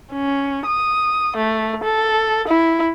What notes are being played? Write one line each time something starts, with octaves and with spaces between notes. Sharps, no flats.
C#4
D#6
A3
A4
E4